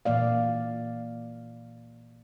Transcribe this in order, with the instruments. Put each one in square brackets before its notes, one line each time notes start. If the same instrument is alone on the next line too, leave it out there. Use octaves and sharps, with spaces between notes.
[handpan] A#2 E3 A#3 D5 F5